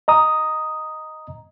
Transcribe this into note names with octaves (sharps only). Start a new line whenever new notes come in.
D#5 A#5 D#6